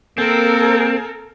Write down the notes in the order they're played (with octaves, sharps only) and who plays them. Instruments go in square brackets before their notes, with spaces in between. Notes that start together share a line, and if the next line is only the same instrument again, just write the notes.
[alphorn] A#3 [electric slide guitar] C4 [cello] A4 A#4